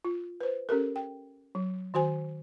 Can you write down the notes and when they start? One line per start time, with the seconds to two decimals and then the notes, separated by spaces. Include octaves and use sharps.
0.05 F4
0.41 B4 C5
0.69 C#4 G4 A4 A#4
0.96 G5
1.55 F#3
1.94 D#3 F#4 C5 G#5